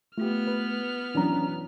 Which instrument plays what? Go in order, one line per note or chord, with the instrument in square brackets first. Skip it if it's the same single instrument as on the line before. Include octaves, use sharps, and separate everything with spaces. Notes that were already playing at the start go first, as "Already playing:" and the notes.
[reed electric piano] A3 [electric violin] B3 F6 [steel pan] F4 G4
[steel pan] B4
[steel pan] E3 F#3 [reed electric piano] C#4 D4 A#5